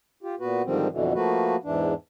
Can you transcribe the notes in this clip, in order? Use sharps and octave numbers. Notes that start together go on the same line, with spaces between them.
F4 G4
A#2 B3 F#4 B4
G#2 D3 D#3 F3 G3 C4
F2 B2 D3 E3
F3 A3 A#3 F#4 B4
E2 G#2 E3 D4